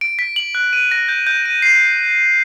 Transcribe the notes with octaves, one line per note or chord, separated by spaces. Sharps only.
D7
B6
F#7
F#6
D#7
A#6
G6
G6
D#7
C7